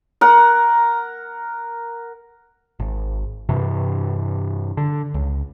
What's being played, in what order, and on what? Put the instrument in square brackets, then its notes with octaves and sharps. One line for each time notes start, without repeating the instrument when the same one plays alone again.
[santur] A#4 F#5
[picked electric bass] G#1
G2 C3 E3
D3
C#2